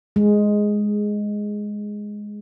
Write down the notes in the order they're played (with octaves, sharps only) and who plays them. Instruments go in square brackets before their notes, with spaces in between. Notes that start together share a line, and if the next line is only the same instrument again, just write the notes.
[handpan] G#3